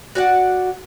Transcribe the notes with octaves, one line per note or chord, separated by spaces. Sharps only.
F#4 D5 F#5